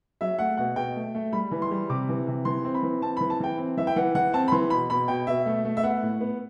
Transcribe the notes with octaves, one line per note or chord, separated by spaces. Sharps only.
F#3 E5
A3 F#5
B2 F#5
B2 G5
A3
A3
G3 B5
E3
C6
G3
C3 D6
E3
C3
E3 C6
C4
B5
E3
C4 A5
E3 B5
A5
E3 G5
C4
E3 E5
G5
E3 F#5
E3 F#5
C4 A5
B5
E3 C6
B2 B5
B2 B5
B2 G5
B2 E5
A3
A3
E5
B3 F#5
A2
B3